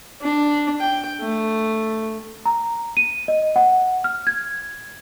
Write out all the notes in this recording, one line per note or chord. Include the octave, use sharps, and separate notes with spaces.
D4
G5
A3
A#5
D#7
D#5
F#5
F6
G#6